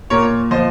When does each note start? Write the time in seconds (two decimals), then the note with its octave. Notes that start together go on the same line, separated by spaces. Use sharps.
0.10 A#2 A#4 C#5
0.51 F3 C5 D#5